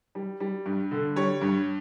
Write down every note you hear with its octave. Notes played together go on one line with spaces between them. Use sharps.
G3
G3
G2
D3
G3 C#5
G2